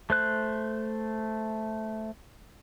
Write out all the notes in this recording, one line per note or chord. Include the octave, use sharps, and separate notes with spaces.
A3 C5 F#6